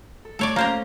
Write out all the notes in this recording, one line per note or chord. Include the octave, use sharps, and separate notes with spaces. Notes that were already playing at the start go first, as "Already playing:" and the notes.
A4
A3 A4 C#5 D5
A#3 C#4 C5 A#5